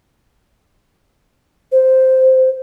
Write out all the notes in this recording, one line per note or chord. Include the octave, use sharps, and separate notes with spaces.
C5